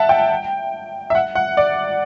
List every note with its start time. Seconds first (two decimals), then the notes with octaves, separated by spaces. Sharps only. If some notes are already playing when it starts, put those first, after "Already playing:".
Already playing: E5 F#5 A5
0.09 G5
1.10 E5
1.15 F#5
1.35 F#5
1.57 D5